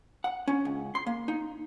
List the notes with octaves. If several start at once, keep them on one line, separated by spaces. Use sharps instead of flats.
F#5
C#4
C#2
C6
A#3
D#4